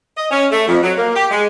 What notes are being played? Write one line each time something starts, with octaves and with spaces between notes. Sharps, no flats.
D#5
C#4
A3
F2
F#3
A#3
G4
G#3